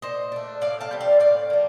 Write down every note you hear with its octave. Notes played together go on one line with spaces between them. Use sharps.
A#2 C5 D#5
A3 D4
A2 D5 F5
F5 A5
G3 C4
D5 F5
A2 D5 F5
F3 A#3